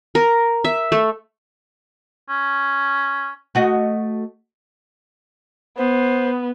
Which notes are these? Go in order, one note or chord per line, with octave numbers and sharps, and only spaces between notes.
A#4
E5
A3
C#4
A3 F#4 D#5
B3 C5